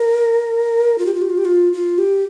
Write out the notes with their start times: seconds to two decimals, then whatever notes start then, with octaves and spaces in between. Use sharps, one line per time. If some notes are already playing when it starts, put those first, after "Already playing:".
Already playing: A#4
0.98 F4
1.06 G4
1.14 F4
1.22 G4
1.30 F4
1.38 G4
1.45 F4
1.73 F4
1.98 G4